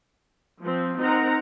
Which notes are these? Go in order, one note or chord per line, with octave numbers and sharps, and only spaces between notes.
F3 C4
C4 D#4 A#4 F#5 A#5